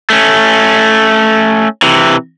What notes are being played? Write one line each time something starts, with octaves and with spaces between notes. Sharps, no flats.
A3 C#4
C3 E3